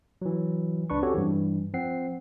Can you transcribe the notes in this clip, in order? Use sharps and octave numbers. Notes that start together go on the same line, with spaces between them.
E3 F#3
C#2 D4 B4 C#6
C4 C#4 F#4 G4 A4 C#5
G2 E3
F3 C4 F#5 C7